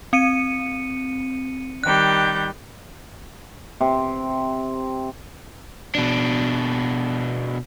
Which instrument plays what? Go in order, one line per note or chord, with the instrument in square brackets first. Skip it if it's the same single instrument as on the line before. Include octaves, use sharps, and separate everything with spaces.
[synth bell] C4 C#7 D#7
[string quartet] D#3 G3 G6 [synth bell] F#6
[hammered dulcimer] C3
[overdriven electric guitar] B2 D4